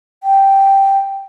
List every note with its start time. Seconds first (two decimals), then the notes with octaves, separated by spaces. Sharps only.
0.23 G5